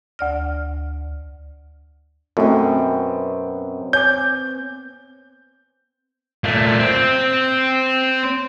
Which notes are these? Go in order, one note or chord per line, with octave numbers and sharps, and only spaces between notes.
D2 D5 F6
F#2 B2 A3 B3 C4 E4 A4
C#5 G#5 D6 G6
A#2 A3
C4